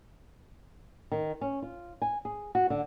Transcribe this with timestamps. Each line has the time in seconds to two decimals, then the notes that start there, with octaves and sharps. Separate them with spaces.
1.12 D#3
1.41 C#4
1.62 F4
2.02 G#5
2.25 G#4
2.55 F#4
2.70 D3